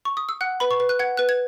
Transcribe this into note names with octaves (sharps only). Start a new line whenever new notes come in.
C#6
D#6
E6
F#5 F#6
B4 B5
C#6
B4
F#6
F#5 G#6
B4 F#6
G#6